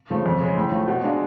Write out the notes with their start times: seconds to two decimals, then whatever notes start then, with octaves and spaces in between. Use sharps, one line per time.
0.10 C#3 F3 A3
0.26 F2
0.41 C#3 G#3
0.56 A2
0.72 F3 A3
0.88 B2
1.03 G#3 D4 F4